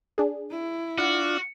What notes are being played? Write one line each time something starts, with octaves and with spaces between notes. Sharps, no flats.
D4 G#4
E4
D4 F4 F#4 F#5